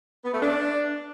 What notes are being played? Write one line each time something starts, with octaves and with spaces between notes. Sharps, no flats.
B3
A3
D4